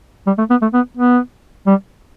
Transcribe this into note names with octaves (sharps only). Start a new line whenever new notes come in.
G3
A3
B3
A3
B3
B3
G3